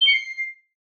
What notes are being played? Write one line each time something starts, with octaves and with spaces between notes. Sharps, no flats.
G7
C#7
C7